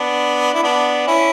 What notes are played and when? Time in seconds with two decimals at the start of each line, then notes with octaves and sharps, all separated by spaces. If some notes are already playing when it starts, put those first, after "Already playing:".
Already playing: B3 D4
0.54 E4
0.63 B3 D4
1.07 C#4 E4